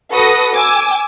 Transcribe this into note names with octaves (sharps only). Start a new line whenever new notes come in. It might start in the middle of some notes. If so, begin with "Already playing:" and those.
F#4 A4 B4 F#5 D#6 A#6
G#5 D6 E6